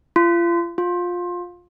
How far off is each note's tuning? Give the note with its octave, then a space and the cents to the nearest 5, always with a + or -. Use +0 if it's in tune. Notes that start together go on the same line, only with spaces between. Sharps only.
F4 -35
F4 +20